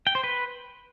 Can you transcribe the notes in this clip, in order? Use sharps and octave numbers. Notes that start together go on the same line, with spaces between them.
G5
C5
B4